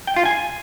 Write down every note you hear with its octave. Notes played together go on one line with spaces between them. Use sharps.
G5
F4
G#5